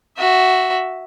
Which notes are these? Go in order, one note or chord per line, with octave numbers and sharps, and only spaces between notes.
F#4 E5